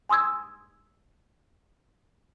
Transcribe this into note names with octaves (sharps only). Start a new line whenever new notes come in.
G#5 C6 D#6 E6 G#6